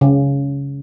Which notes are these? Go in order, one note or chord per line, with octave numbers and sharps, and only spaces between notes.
C#3